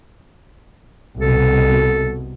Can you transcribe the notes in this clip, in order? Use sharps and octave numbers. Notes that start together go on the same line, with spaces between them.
C2 B2 A4